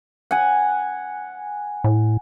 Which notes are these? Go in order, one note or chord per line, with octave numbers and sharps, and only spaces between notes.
F#5 G#5
A2